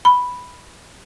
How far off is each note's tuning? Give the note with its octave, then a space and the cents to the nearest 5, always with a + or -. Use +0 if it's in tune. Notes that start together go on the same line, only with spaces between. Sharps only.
B5 +0